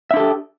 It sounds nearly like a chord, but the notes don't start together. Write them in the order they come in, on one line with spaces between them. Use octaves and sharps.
E5 D4 A4 G4